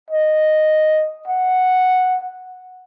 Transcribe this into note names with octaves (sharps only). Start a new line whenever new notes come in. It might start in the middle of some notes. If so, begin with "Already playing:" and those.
D#5
F#5